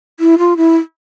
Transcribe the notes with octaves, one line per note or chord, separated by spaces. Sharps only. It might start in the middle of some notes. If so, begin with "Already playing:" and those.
E4
F4
E4